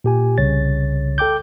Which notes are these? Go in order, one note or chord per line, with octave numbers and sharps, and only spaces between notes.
A#2 G4 G#5
C2 C#3 C#5 A6
A4 G5 D6 G6